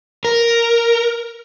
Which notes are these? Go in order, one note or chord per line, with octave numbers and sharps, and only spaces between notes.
A#4